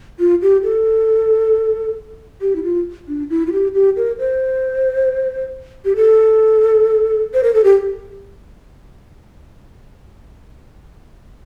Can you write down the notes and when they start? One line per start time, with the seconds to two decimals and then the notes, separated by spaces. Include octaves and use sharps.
0.19 F4
0.42 G4
0.63 A4
2.41 G4
2.55 E4
2.63 F4
3.08 D4
3.30 E4
3.47 F4
3.52 G4
3.74 G4
3.97 A#4
4.19 C5
5.85 G4
5.96 A4
7.34 C5
7.43 A#4
7.54 A4
7.64 G4